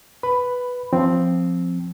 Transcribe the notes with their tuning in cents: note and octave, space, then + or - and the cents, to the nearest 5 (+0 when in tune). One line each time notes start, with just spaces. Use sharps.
B4 +0 B5 +10
F3 +0 C4 +0